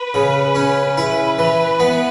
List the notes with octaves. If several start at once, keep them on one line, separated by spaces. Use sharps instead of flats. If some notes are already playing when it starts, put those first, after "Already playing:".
Already playing: B4
C#3
C#4
E4 B4
E3
B3